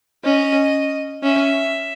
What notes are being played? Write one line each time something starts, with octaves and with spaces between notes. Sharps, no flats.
C#4 D#5
C#4 E5